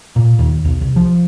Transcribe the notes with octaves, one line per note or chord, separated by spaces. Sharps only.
A#2
D#2
B1
C2
F3